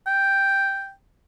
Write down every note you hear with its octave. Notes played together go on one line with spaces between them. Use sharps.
G5